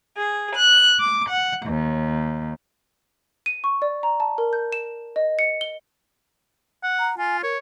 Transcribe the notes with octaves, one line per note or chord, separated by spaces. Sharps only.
G#4
F#6
D6
F#5
D#2
D#7
C#6
D5
A#5
A5
A#4
G6
E7
D#5
C#7
G7
F#5
A#5
F4 G#5
A#4 C#5